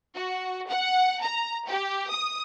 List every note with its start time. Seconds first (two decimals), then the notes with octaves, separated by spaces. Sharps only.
0.17 F#4
0.67 F#5
1.22 A#5
1.68 G4
2.09 D#6